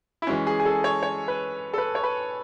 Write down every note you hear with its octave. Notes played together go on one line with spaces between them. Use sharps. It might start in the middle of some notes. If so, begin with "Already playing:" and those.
E4
E3 G#3 C#4 F#4
G#4
G#4
A4
C#5
C#5
B4
A4
B4
C#5
B4